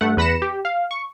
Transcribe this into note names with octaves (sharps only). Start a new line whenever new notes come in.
G2 A3 F#5
E2 B4 B5 A#6 C#7 E7
G4
F5
C#6